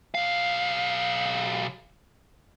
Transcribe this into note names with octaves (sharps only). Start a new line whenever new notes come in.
B1 F5